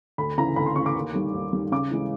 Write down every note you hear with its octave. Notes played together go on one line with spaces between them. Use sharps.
D2 B5
C#3 E3 A#5
D2 B5
C6
C#3 E3 C#6
D6
D#2
D#3 G3
D#2
D#3 G3
C#3 D6
E3 G#3 C#4